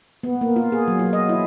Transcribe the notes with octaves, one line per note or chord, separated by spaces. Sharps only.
B3
A#3
F4
G#4
F#3
F4
D#5
E4